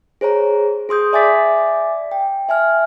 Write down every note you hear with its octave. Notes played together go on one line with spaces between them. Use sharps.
G#4 C5 C#5 A#5
G#4 C6 D#6 G6
D5 E5 G#5 D6 A6 B6
G5
E5 G#5 F6